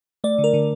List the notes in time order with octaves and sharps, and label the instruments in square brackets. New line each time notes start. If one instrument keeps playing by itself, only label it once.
[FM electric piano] A3 D5
D3
A#4
D3